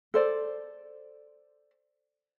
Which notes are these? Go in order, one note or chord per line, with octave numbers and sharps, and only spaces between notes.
A4 C5 D5